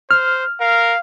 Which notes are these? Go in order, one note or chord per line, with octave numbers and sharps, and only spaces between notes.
C5 F6
A#4 F5